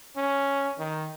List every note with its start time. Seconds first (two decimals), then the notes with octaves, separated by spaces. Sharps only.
0.16 C#4
0.79 D#3